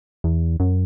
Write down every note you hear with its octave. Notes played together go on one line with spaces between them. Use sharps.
E2
F#2